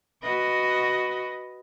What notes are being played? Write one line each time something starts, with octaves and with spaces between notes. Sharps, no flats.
F#4 B4 D#5